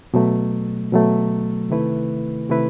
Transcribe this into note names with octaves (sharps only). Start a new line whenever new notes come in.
B2 F#3 A3
B2 F#3 A3
C3 D#3 A3 E4 B4
C3 D#3 A3 E4 B4